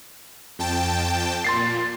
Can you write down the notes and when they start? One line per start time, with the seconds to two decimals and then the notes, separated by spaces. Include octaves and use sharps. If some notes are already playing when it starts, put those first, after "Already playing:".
0.59 F2 G5 A5
1.44 A#2 C6 A6 C7